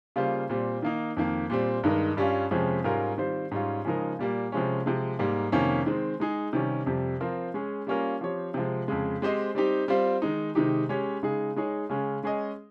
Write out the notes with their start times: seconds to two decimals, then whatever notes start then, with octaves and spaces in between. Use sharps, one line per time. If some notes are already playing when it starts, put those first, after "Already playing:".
0.16 C#3 G3 A#3 F4 C5
0.49 A#2 G3 C4
0.82 D#3 A#3 D#4
1.17 F2 D#3 A#3
1.50 A#2 G3 C4
1.83 G2 D#3 G#3 D#4 A#4
2.17 G2 G3 C#4 F4
2.51 F2 C3 F3 G#3 C#4
2.84 G#2 G3 C#4 F4 A#4
3.18 D#3 G3 C4 F4 C5
3.51 G#2 G3 C#4 F4
3.85 C#3 F3 G#3 D#4 A#4
4.19 A#2 G3 A#3
4.52 C3 F3 G#3 C#4
4.86 C3 F3 G#3
5.19 G#2 G3 A#3
5.52 F2 C3 D#3 A#3 C#4
5.86 D#3 G#3 C4
6.20 G#3 D#4 G#4
6.53 C3 D#3 G3 C#4
6.86 F2 C3 G3
7.21 F3 C4 F4 A#4
7.54 G#3 C#4 G#4
7.87 G3 A#3 C#4 F4 A#4
8.21 F3 C4 G4 C#5
8.54 C3 F3 G#3
8.88 F2 C#3 G#3
9.22 G#3 C4 G4 C5 D#5
9.55 G3 C4 D#4 G4
9.88 G3 C4 F4 C5
10.22 D#3 G#3 D#4
10.55 C3 D#3 G#3 D#4 G4
10.89 G#3 C#4 G4 C#5
11.23 C#3 G#3 D#4 G#4
11.56 G#3 D#4 G#4 C#5
11.89 C#3 G#3 C#4
12.23 G#3 C#4 G#4 D#5